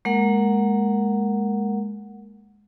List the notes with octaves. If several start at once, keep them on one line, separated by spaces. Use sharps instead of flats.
G#3 A#3 A#4 F#5